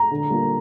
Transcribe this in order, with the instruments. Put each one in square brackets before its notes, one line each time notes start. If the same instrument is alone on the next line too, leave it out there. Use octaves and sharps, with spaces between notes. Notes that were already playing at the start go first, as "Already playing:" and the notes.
Already playing: [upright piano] A#5
[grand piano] D3
G3 A#3 F4